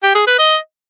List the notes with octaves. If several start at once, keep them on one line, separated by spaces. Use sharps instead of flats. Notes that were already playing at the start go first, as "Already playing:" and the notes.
G4
G#4
B4
D#5